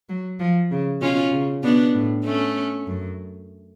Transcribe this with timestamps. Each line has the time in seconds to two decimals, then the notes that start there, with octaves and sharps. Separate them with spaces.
0.09 F#3
0.40 F3
0.71 C#3
1.01 B2 C#4 F4
1.32 C#3
1.63 B2 B3 D4
1.94 A2
2.24 A3 C#4
2.87 F#2